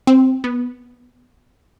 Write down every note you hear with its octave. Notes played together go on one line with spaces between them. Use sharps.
C4
B3